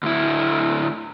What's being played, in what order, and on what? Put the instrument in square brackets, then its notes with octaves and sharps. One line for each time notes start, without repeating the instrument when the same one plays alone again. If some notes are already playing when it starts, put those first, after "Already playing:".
[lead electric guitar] D2 E4